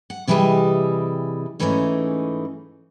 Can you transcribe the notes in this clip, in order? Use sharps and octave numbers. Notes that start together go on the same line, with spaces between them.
F#5
C3 E3 G3 G4 G#4 D#5
G#2 E3 A3 B3 C#4 D#4